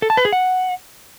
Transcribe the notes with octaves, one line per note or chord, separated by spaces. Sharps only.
A4
A5
B4
G#4
F#5